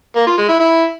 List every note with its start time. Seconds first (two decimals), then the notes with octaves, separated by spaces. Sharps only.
0.16 A#3
0.27 F4
0.38 G#3
0.49 E4
0.60 E4